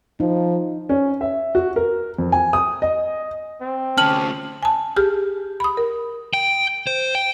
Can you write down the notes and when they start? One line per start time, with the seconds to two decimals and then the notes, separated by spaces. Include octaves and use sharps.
0.20 F3 D#4
0.89 C#4
1.21 E5
1.55 F#4
1.76 A#4
2.18 F2
2.32 G#5
2.53 D#6
2.82 D#5
3.61 C4
3.98 D2 C#4 A5 F6 F#7
4.63 G#5 A5
4.96 G4 G#4 F6
5.60 B5 D#6
5.77 A#4
6.34 G5
6.87 C5
7.15 G5